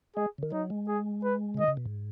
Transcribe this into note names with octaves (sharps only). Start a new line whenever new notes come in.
G#3 G#4
C#3
D#3
F#3 D#4
G#3
G#4
B4
C#3
D#3 D#5
C#3
B2
G#2